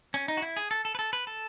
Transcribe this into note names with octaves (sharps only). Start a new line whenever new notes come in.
C#4
D#4
F#4
E4
G#4
A4
A4
B4
A4
B4
A4